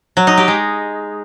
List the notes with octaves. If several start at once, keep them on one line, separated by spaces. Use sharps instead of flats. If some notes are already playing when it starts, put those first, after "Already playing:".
F#3
D#4
G4
G#3